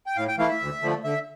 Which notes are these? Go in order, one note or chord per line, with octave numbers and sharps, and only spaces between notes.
G5
A2 F5
G5
E3 A3 E4 F5
E5
D2
D3 F3 A3
D3 E5